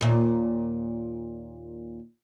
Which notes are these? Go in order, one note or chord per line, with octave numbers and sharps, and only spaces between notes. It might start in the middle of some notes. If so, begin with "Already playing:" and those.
D#2 A#2